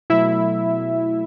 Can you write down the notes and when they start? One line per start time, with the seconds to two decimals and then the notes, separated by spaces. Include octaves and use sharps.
0.10 B2 F#3 A3 E4 E5